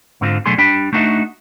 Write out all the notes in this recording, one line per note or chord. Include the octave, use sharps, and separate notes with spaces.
G#2 D3 C4 F4
B2 F#3 A3 D4 G#4 C6
G3 D4 G5 B5
A3 D4 D#4 F#4 E5